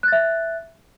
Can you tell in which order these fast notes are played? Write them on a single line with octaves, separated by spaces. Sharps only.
F#6 A6 E5